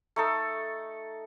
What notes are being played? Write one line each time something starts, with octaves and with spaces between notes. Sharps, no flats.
A3 D#4 A4